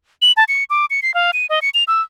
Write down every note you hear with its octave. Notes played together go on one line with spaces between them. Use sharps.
F#7
A5
C#7
D6
C#7
C7
F5
D#7
D#5
C#7
F7
E6